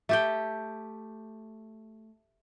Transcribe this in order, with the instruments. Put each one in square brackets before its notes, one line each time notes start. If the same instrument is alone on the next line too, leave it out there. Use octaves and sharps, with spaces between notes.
[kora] A3 G4 G5